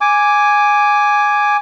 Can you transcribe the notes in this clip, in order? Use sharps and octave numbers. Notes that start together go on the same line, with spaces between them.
G#5 D6